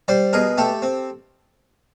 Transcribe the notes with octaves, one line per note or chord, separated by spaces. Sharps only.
G3 C5 D5
B2 G#4 A#4
A3 G4 A4
C4